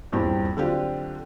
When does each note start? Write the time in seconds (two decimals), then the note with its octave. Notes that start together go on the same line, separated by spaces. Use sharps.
0.12 D#1 E2 G2 C4 G4
0.57 D3 F#3 C4 D4 F4 G4